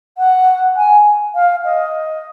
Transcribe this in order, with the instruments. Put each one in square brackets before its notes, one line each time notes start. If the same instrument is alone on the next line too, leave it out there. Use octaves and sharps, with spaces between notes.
[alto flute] F#5
G#5
F5
D#5